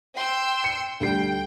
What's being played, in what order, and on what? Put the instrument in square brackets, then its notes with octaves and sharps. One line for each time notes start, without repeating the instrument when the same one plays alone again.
[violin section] G5 C6 E6
[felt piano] C#7
[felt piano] D2 G3 C7 [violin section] G5